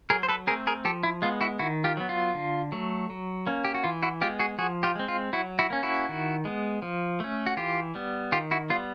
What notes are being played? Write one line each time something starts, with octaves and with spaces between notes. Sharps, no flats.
F#3 G#4 A#4
C5
A4 B4
A3 C4 G#4 A#4
G#4 A#4
F3 G4 A4
E4
G#3 B3 F4
E4 F#4
D#3 E4 F#4
F4 G4
F#3 B3
F4
D3
F#3 A3
F#3
A#3 C#4
G4
F#4
E3 F4
E4 F#4
G#3 B3 F4 G4
F#4 G#4
F3 F#4 G#4
F4 G4
G#3 C4
F4
F#3 E4 F#4
E4 F#4
A#3 C#4
E4 F#4
D#3
G#3 B3
F3
A3 C#4
F#4
E3 F4 G4
G3 B3
D#3 F4 G4
E4 F#4
G3 B3 F4